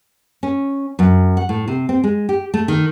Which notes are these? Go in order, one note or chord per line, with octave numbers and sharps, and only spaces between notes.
C#4
F#2
F#5
A2
C3
C4
G#3
G4
A3
D#3